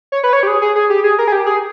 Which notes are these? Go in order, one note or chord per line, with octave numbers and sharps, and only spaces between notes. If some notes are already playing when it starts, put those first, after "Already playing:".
C#5
B4
C#5
G4
G#4
G#4
G#4
G4
G#4
A#4
G#4
G4
G#4